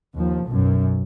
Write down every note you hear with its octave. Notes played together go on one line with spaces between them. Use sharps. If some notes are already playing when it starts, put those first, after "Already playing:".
D#2 F3
B1 F#2